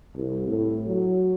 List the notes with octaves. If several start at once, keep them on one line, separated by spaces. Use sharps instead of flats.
C2
A2
F#3